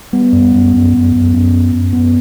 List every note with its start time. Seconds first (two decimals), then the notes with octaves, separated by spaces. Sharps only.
0.13 G3 B3
0.33 F#2
0.53 F#2
0.73 F#2
0.93 F#2
1.12 F#2
1.33 F#2
1.52 F#2
1.72 F#2
1.93 F#2 B3